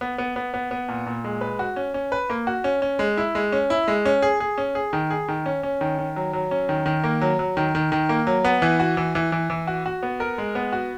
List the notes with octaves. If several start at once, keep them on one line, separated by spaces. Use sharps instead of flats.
B3
B3
B3
B3
B3
A#2
A#2
G#3
B4
F#4
C#4
C#4
B4
A#3
F#4
C#4
C#4
G#3
E4
G#3
C#4
E4
G#3
C#4
G#4
G#4
C#4
G#4
D#3
G#4
D#3
C#4
C#4
D#3
D#3
F#3
F#3
C#4
D#3
D#3
A#3
F#3
F#3
D#3
D#3
D#3
A#3
F#3
B3
E3
F#4
E3
E3
E3
E3
F#4
F#4
B3
A#4
G#3
B3
F#4